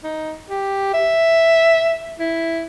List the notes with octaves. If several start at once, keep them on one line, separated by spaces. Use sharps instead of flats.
D#4
G4
E5
E4